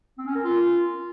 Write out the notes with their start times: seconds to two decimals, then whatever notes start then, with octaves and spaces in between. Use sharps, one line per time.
0.18 C4
0.27 C#4
0.35 A#4
0.44 F4